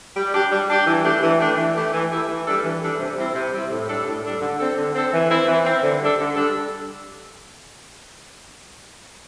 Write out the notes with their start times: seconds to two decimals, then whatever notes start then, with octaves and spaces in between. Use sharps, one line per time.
0.16 G3
0.34 D4 G4
0.51 G3
0.69 D4 G4
0.86 E3
1.05 A3 D4 G4
1.22 E3
1.40 A3 D4 G4
1.57 E3
1.75 A3 E4 G4
1.93 E3
2.11 A3 E4 G4
2.29 E3
2.47 G3 D4 A4
2.64 E3
2.82 G3 D4 A4
2.99 C3
3.17 G3 C4 E4
3.34 C3
3.52 G3 C4 E4
3.70 A2
3.88 G3 D4 A4
4.06 A2
4.24 G3 D4 A4
4.41 D3
4.59 C4 A4
4.77 D3
4.94 C4 A4
5.12 E3
5.30 C4 E4
5.48 E3
5.65 C4 E4
5.82 D3
6.01 G3 D4 A4
6.19 D3
6.36 G3 D4 A4